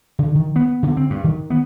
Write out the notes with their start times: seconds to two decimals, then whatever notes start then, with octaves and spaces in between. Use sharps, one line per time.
0.19 D3
0.35 D#3
0.56 B3
0.83 D3
0.97 C4
1.10 G2
1.24 D#3
1.50 B3